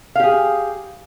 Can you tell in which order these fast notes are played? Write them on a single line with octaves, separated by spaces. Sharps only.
F5 G4 G#4